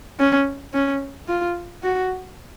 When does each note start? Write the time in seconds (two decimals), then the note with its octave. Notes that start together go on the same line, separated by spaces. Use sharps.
0.19 C#4
0.74 C#4
1.28 F4
1.83 F#4